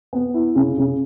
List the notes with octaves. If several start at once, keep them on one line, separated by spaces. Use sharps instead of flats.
B3
E4
C#3
C#3